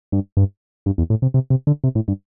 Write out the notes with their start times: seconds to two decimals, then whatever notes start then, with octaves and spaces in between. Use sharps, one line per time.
0.12 G2
0.37 G2
0.86 G2
0.98 E2
1.10 A2
1.22 C3
1.34 C3
1.50 C3
1.67 D3
1.84 C3
1.95 A2
2.08 G2